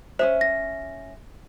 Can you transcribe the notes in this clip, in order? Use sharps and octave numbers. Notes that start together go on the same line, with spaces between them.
C#4 D#4 C5 E5
A#6